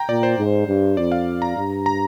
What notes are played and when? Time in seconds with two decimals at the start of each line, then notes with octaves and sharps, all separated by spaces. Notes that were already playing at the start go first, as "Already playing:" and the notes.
Already playing: G5 A#5
0.09 A#2 D5
0.23 C5
0.38 G#2
0.67 G2
0.97 F2 D5
1.12 F5
1.42 A#5
1.56 G2
1.86 A#5